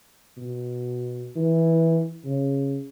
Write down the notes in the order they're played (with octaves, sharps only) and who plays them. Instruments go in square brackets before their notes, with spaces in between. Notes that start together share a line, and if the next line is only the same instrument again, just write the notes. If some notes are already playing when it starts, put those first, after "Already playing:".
[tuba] B2
E3
C#3